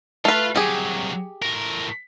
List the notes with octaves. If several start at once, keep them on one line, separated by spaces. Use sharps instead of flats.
A3 F4 B4 F5
C2 F#3 G4 G#4
A2 A#4